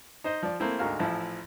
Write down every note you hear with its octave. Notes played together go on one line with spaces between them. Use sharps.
D#4 C5 D#5
F3 D5
A3 A#3 C4 E4
D2 G#2 F#4 A#4 F5
A1 F3 E4